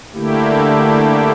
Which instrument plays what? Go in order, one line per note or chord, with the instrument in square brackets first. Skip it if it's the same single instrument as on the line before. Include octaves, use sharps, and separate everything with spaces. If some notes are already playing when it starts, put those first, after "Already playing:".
[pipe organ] D3 A3 A#3 E4 G4